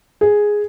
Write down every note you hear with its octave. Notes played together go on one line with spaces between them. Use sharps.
G#4